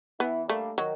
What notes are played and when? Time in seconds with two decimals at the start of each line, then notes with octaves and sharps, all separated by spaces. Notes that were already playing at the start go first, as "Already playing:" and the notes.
0.20 E3 B3
0.48 G3 A3 A#3 D4
0.78 D#3 F#3